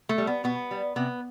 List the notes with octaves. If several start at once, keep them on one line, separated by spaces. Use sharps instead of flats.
A3
G3
B3
B2 B3
G3
C3 B3